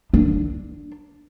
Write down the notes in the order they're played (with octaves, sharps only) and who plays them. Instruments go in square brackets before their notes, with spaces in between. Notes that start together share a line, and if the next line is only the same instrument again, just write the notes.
[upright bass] D4